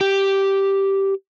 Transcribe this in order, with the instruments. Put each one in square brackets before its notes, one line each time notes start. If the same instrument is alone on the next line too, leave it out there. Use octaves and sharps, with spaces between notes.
[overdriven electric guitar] G4